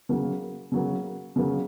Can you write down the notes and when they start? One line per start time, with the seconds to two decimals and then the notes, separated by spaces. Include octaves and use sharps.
0.09 C#3 F#3 A#3
0.72 C#3 F#3 A#3
1.36 C#3 F#3 A#3